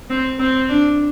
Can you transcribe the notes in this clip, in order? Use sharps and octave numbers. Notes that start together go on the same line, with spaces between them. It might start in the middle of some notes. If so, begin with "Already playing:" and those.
C4
C4
D4